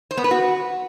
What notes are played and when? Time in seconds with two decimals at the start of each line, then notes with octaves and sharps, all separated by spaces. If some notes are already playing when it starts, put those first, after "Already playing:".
0.11 C5
0.17 B3
0.24 B4
0.31 F#4